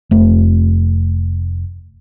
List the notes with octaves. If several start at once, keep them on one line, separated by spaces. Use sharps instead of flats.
F1 A3